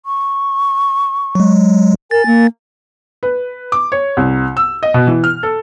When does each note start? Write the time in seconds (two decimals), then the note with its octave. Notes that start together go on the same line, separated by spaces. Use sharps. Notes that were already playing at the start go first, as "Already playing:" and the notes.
0.06 C#6
1.35 F#3 G#3
2.11 A#4 G#5 A6
2.26 A#3
3.23 B4
3.72 D6
3.92 C#5
4.17 C2
4.57 E6
4.83 D#5
4.94 B2
5.07 E3
5.24 F6
5.43 A4